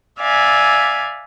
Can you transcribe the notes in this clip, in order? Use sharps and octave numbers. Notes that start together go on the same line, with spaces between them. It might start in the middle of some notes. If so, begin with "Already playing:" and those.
D5 E5 F5 G#5